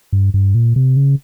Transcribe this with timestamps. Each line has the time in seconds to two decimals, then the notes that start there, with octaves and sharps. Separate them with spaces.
0.13 G2
0.34 G2
0.55 A#2
0.76 C3
0.96 C#3